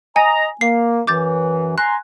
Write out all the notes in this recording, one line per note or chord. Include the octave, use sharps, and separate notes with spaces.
D#5 G#5 A#5
A#3 C7
F#2 E3 D6 G6 A6
G#5 A#5 C6 F#6